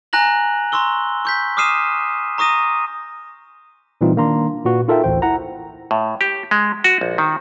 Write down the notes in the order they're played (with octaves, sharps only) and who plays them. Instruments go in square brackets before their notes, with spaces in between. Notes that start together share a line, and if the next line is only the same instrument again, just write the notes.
[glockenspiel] G#5 A#5 F#6 A#6 F#7
A#5 C6 C#6 E6 G7
C#6 G6 B6
D6 D#6 F6 C7 D#7 E7
A#5 C#6 D#6 A#6 D#7
[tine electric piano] A#2 E3 G3 C4 D#4 F4
D#3 A#3 D4 A#5 C6
A#2 F#4 B4
D#4 F4 A4 A#4 E5 G5
A1 D2 C5 G5
E4 F#5 A#5
[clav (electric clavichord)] A2
G4
G#3
F#4
A#1
D#3